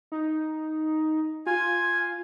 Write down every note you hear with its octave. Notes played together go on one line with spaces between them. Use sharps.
D#4
F4 G#5